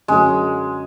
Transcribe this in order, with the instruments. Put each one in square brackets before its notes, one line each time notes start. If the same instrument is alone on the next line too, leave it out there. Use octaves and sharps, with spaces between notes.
[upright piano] F#2 D3 F#3 [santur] G#3